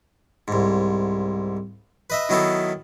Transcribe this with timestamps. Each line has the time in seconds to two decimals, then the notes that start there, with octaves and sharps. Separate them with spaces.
0.48 C2 G#2
2.10 B4 D#5 E5
2.29 D#3 F#3 B3 D#4 E4 A4